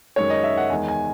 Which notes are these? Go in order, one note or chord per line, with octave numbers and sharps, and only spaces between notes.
F#2 D#3 G#3 C#5
D#5
E5
F#5
E2 D#3 G#3 G#5
G#5